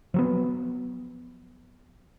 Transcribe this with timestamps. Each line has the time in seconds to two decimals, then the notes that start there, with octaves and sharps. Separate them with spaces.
0.14 F3 F#3 B3